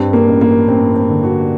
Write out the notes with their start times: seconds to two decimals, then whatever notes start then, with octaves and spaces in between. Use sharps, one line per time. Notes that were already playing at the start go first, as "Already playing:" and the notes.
Already playing: G2 C4
0.13 A#3
0.28 A1
0.41 A#3
0.68 A1 C4
0.96 C4
1.09 D3
1.24 F#4